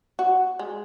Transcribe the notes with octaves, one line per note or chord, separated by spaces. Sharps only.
F#4
G#3